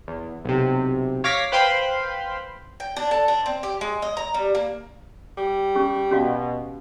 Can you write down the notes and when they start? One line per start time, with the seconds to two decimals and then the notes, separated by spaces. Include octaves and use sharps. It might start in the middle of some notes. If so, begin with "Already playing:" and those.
0.08 E2
0.45 B1 C3
1.24 C#5 F5 C#6 D6 A#6 B6
1.52 B4 C5 F5 G5 B5 C6
2.80 G5
2.96 D4
3.11 A4
3.28 D4
3.46 C4
3.63 G4
3.81 G#3
4.02 D#5
4.17 A#5
4.34 G3
4.55 A#3
5.37 G3
5.75 C#4 G4
6.11 B2 C#4 F#4 F5